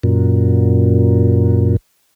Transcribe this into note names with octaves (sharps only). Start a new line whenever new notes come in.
F#2 A#2